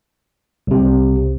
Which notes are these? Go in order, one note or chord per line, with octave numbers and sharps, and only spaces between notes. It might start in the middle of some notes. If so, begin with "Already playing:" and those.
C2 C3